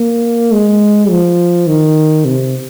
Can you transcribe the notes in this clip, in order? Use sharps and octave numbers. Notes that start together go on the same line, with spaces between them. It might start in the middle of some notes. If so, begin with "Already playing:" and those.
Already playing: A#3
G#3
F3
D#3
C3